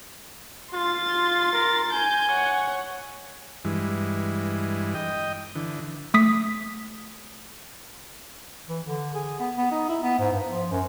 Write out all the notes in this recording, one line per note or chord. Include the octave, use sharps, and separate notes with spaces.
F4 C6 A6
A#4
G#5 G6
C#5 F#5
G2 E3 G#3
D#5 G5
D3 E3
A3 D#6 B6
E3
D3
G#4
B3
B3
D#4
E4
B3
G#2
G2
F3
F#2